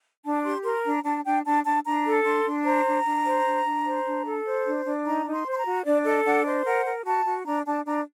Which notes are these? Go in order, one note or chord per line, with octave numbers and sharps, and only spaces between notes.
D4 A5
G4 C6
A#4 C6
D4 A#5
D4 A5
D4 G5
D4 A5
D4 A5
D4 A#5
A4
D4 C6
D4
C5 A#5
D4
D4
C5
D4
D4
C5
D4
A4
C5
D4
D4
D#4 A#5
D#4
C6
C5
C6
A#5
F#4
D4 D5
A4 D#5
D4 F#5
C5 D#5
A#4 F#5
A#4
F#4 A5
F#4
D4 A#5
D4 A5
D4 A#5